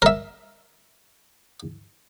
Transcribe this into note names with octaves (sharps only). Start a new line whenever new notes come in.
A#4 E5